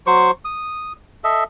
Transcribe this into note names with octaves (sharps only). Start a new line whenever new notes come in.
F#3 C5 C#6
D#6
A4 D#5 E5